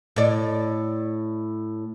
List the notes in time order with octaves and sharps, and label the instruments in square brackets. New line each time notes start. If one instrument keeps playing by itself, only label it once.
[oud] A2 D5